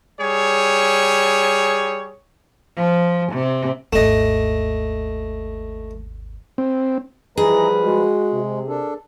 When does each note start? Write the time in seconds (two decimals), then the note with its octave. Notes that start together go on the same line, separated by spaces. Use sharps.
0.20 G3 G#4 C#5
2.77 F3
3.33 C3
3.93 G#1 D#2 A3 D#5
6.58 C4
7.37 E3 F3 G3 G#4 B4 D#5 A#5
7.82 G#3 F#4
8.33 C3
8.68 D4 A4 A#4